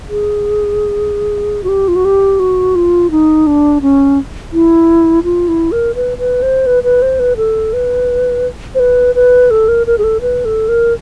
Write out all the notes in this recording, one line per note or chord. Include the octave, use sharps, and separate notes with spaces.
G#4
F#4
G4
F4
F#4
G4
F#4
F4
D#4
D4
C#4
E4
F4
E4
A#4
B4
B4
C5
B4
B4
C5
B4
A4
B4
C5
B4
B4
A4
A#4
A#4
G#4
A4
B4
A4
A#4